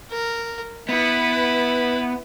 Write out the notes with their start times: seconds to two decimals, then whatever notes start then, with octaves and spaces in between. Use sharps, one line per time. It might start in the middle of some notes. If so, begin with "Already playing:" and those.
0.11 A#4
0.89 B3 E4 B4